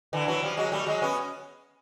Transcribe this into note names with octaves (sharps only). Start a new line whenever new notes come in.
D3 E3
E3 F#3
F3 G3
F#3 G#3
G3 A3
F#3 G#3
B3 C#4